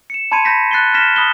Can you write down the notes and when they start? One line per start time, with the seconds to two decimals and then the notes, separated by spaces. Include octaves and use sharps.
0.10 C#7 E7
0.32 A5 B5 C6 G#6 C#7 D#7
0.45 B5 G6 A#6 B6
0.71 F#6 A6 C7 D#7 G7
0.94 F6 A#6 B6 E7 G7
1.16 B5 D#6 F#6 G7